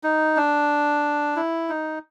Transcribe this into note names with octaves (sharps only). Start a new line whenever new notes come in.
D#4
D4
E4
D#4